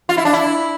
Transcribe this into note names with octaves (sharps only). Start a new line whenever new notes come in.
F4
E4
D4
E4